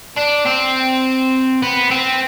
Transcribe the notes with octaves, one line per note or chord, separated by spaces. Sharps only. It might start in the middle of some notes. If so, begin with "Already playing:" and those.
D4
C4
B3
C4